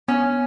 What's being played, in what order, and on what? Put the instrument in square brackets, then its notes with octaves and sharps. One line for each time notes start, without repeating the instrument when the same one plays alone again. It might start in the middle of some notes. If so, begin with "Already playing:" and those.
[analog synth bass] B3 [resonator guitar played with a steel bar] C#4